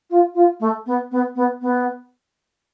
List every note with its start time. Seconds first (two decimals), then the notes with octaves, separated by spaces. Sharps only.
0.10 F4
0.34 F4
0.60 A3
0.86 B3
1.11 B3
1.35 B3
1.61 B3